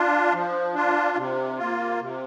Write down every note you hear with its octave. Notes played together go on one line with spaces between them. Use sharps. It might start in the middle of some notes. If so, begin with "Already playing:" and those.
Already playing: D4 F4
F3
D4 F4
C3
A#3 F4
C3